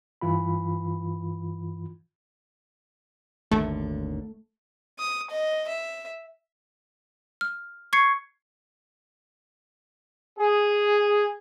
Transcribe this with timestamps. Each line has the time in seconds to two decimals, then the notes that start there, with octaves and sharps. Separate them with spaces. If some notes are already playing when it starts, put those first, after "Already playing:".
0.22 G2 E3 F4 B5
3.51 G#1 D#2 D3 A3
4.99 D#6
5.30 D#5
5.68 E5
7.41 F6
7.93 C#6 G#6 C7 C#7
10.39 G#4